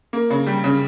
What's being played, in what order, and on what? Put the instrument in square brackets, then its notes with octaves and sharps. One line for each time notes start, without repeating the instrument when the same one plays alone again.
[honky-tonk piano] A#3
C#3
G3
C#3